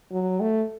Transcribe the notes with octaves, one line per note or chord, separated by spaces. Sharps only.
F#3
A3